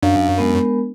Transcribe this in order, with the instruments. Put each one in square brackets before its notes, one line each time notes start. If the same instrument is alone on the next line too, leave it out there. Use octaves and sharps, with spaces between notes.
[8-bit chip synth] F#2 [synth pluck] D4 [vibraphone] F5
[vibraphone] G#3 B3 A#4